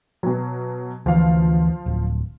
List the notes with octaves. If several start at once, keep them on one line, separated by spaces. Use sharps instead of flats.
B2 F#3
D2 E3 F3 F5
D1